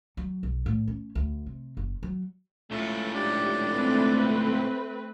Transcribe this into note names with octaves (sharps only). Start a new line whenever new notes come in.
F#3
B1
A2
C#4
D2
C3
F#1
F#3
C#2 A2 A3
D4 G4
A3 C4 B4